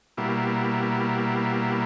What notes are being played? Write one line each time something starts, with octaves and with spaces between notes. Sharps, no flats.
B2 G3 A#3 E4